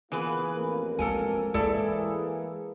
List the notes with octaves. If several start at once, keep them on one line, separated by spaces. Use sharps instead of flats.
E3 A#3 B3 F4 G#4 B4
A1 F2 A#3
G#3 A4 A#4 G#5
E3 G#3 A#3 E4 G#4 A4 D5